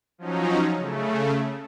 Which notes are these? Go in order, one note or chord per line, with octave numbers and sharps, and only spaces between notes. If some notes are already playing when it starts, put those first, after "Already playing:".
F3 F#3 C#4 D#4
C#3 A3